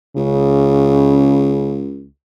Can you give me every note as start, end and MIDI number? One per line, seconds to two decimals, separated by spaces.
0.17 2.07 37
0.17 1.88 49